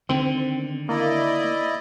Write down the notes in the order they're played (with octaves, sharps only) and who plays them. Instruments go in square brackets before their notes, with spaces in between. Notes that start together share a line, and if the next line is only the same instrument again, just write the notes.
[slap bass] D3 D#3 [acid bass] C4
[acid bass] A#3 [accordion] E4 D5 D#5